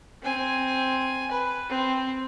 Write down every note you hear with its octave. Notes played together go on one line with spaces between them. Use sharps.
C4 G#5
B4
C4